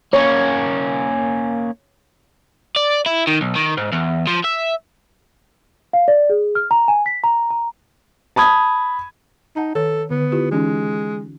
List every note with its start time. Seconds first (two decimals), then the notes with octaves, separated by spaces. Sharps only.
0.13 A#3 C#4 C#5
2.76 D5
3.06 E4
3.27 D#3
3.41 B1
3.55 D#3
3.77 G#2
3.92 E2
4.27 F3
4.44 E5
5.93 F5
6.08 D5
6.30 G#4
6.55 F6
6.71 A#5
6.88 G#5
7.06 B6
7.24 A#5
7.50 A#5
8.36 A5 B5 D#6 G#6
9.56 D#4 F#5 A5 A#5
9.75 D#3 A4 C#5
10.10 D3 B3
10.32 E4 F4 G4
10.51 E3 G#3 C#4 D#4